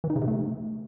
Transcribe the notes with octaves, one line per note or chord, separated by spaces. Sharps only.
E3
D#4
C#3
C3
A3